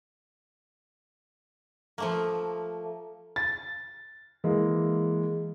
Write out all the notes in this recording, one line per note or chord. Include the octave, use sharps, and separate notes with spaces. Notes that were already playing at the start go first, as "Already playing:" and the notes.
F3 A3 A#3
A6
E3 G#3 A#3